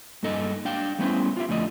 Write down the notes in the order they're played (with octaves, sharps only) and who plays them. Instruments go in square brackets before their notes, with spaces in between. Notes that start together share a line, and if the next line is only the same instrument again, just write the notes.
[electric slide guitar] G2 A#3 D#4 A4 D#5
D4 F5 G5
G3 A3 B3 C#4 E4 C5
F4 G4 E5
F2 D3 A3 D5 D#5